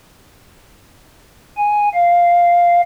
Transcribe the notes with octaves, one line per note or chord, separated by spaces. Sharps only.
G#5
F5